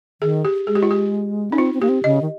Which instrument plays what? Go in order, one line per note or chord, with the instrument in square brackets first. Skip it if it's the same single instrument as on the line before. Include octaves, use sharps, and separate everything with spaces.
[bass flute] D#3 [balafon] G#4
[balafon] G4
[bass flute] G#3 [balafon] G#4
[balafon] G4
F4
G4
[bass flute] C#4 [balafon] D#4
[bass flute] C4 [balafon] F4
[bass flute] C4
[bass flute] A#3 [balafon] G4
[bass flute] C4
[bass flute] C#3 [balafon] D#5
[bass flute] D#3